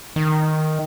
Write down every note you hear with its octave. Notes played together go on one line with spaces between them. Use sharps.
D#3